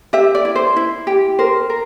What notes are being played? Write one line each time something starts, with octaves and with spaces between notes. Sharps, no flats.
G4 E5
D5
E4
C5
E4
G4
A#4 C5
A#4